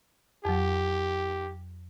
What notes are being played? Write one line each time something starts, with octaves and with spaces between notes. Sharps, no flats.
F2 F#3 G4